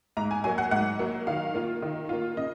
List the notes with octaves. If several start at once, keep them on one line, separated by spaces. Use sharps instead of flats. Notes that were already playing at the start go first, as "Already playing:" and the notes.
G#2 A#5
G#5
F#3 A#3 G#5
F#5
G#2 F#5
F#3 A#3
D#3 F5
A#3 F4
D#3
A#3 F4
C#3 D#5